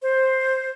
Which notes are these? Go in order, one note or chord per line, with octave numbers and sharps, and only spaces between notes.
C5